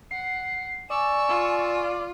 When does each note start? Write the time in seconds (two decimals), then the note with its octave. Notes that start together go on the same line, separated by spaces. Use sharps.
0.11 F#5 C7
0.90 D5 G#5 C#6 E6
1.29 F4